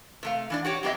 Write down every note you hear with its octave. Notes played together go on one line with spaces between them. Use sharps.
C3 A3 F5
E3 D4 D5
F#4 G4 C#5
F#3 C4 G4 G#4 D#5 E5